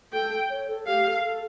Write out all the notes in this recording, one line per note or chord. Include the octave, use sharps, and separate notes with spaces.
A4 G5
C#5
A4
G4 F5
A4
A4